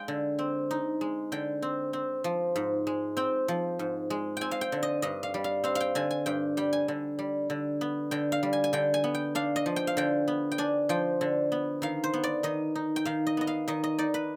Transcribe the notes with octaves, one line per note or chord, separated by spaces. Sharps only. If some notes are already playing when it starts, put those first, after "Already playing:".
Already playing: G#3 F5 G5
D3
C4
D#4
G#3
D3 G5
C4
C4
F3
G#2
G#3
C4 G5
F3
G#2
G#3
C4 G5 G#5
F5
G5
D3
D#5
G2 D#5
F5
G3
F5
C4 F5
F5
G5
D3 G#5
G#5
G2 G5
G3 G5
G#5
D3
G3
D3
B3
D3 G5
F5
G3
G#5
G#5
D3 G5
G#5
B3
G5
D4 F5
D#5
F3
G5
F5
D3 G5
B3
G5
D4 G#5
F3 G5
D3
B3
D#3 F5
C5
B3
D5
D#3 D#5
D#4
G5
D#3 F5
D#5
B3 D#5
F5
D#3 D#5
D#5
D#4 D5
B4